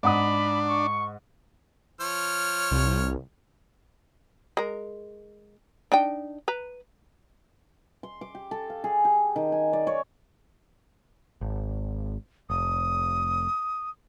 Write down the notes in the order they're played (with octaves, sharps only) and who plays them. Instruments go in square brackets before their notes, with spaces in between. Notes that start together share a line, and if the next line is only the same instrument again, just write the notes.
[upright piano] G#2 F#5 D#6 [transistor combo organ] D4 [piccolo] B5
[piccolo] C#6
[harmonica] F3 C#5 F6
[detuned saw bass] C2
[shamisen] G#3 A#4
D4 D#4 G5
B4 A#5
[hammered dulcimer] C6
D6
G4
A4
F5
G#4
G4
D#3
G#5
D5
C#5
[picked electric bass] G#1
[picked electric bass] F1 [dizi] D#6